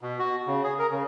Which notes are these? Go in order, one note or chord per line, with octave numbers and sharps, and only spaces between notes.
B2
F#4
C#3
G#4
A#4
C#3